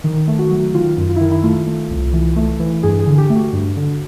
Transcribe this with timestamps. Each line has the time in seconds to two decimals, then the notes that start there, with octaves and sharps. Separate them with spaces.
0.04 D#3
0.28 A3
0.39 F#4
0.50 F#3
0.74 D#3 F4
0.97 F#2
1.09 F4
1.16 E4
1.21 D#3
1.32 E4
1.43 A3 F4
1.67 A3
1.91 C2
2.13 E3
2.36 A3
2.60 E3
2.83 G2 G#4
3.00 G#4
3.06 D3
3.18 G4
3.30 A3
3.36 F#4
3.53 G2
3.76 D3